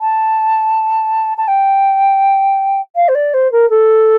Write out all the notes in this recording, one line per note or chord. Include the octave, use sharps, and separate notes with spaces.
A5
A5
G5
F5
C5
D5
C5
A#4
A4